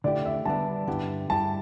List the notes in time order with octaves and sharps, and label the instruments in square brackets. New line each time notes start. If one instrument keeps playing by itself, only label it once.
[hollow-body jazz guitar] D3 A3 E4 G4 [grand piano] D5
[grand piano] E5
[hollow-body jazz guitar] D3 G3 B3 D4 [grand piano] A5
[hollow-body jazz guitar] G2 D3 B3 E4 G4
[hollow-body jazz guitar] G2 G3 E4 G4 [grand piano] A5